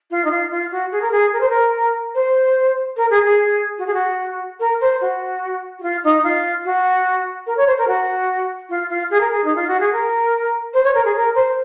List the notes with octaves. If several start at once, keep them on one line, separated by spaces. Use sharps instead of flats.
F4
D#4
F4
F4
F#4
G#4
A#4
G#4
A#4
C5
A#4
C5
A#4
G#4
G#4
F#4
G#4
F#4
A#4
C5
F#4
F#4
F4
D#4
F4
F#4
A#4
C#5
C5
A#4
F#4
F4
F4
G#4
A#4
G#4
D#4
F4
F#4
G#4
A#4
C5
C#5
A#4
G#4
A#4
C5